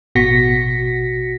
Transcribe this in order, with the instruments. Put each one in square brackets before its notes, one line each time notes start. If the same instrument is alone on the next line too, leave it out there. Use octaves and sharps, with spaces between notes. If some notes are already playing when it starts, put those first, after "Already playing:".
[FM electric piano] A1 B2 F#4 A#6 B6 C#7